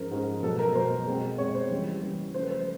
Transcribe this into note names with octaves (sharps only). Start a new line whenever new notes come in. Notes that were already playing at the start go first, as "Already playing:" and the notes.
Already playing: G#2 F3 G#3 C#4 A#4
G#2 F3 G#3 C#4
B2 F#3 B3 A4
A#4
B2 F#3 B3 C5
B2 G#3 C4
B2 G#3 C4 C#5
C5
C#3 E3 G3
C#3 E3 G3
C#3 F3 A3 C5
B4
C5